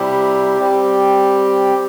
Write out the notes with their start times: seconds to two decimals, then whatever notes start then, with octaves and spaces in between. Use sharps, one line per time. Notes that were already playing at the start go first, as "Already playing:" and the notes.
Already playing: C3 G3 E4 G4
0.58 G3 C4 G4